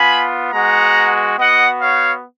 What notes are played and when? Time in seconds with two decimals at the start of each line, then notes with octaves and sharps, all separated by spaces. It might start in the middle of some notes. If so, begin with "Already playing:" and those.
Already playing: B3 F4 G#5 B5
0.53 G#3 B3 F#4 F#5 A#5
1.38 B3 F#4 D#5 F#5
1.81 C#5 F5